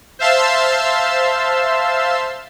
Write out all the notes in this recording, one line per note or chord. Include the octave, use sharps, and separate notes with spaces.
C5 E5 F5 A5 C6 E6